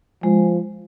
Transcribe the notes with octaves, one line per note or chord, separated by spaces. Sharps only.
F3 G#3